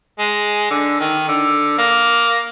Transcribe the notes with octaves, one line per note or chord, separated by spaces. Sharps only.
G#3
D3
D#3
D3
A#3